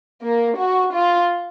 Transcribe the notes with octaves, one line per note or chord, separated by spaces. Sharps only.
A#3
F#4
F4